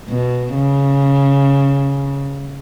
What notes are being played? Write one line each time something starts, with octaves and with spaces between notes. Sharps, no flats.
B2
C#3